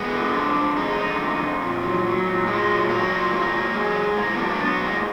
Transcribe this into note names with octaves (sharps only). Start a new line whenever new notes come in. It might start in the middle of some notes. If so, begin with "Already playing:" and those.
Already playing: G#3 B3
D3
F2 D4
F2
G#3 D#4
D3
F2
F2
A#2
F#3
F#3
A#2
A#2 G#3
F#3
F#3 A#3
A#2
G#2 A#3
F#3
F#3 G#3
G#2
G#2 A#3
B3
F#3 D4
A#3
F#3 B3
G#2 A#3